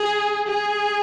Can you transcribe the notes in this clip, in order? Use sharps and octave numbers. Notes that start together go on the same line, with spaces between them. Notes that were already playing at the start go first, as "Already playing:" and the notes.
Already playing: G#4
G#4